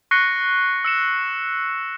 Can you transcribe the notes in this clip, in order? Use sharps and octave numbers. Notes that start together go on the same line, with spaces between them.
C#6 F#6 A#6 C7 C#7 G7
E6 C#7 E7